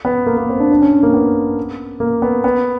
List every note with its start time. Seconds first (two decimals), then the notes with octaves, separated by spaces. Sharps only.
0.05 B3
0.26 A#3
0.37 A#3
0.49 C4
0.60 D4
0.71 D4
0.81 C#4
1.03 A#3
1.14 B3
2.00 A#3
2.22 B3
2.44 B3